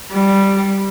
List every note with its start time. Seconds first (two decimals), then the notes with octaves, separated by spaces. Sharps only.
0.13 G3